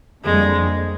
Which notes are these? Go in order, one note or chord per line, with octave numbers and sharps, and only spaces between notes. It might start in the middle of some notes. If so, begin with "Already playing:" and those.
F2 D3 G3 G#3 A#3